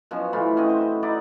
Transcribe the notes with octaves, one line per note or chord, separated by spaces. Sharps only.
B2 F3 F#3 C#4
A2 E3 F4 B5
C4 C#4 F#4 D#5
C5
B4
D#4 E4 D5 F#5